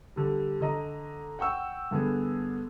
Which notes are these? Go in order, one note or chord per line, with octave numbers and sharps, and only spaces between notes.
D3 G3
D3 D#5 A#5
F#5 G5 C#6 E6
G2 D3 B3 G#4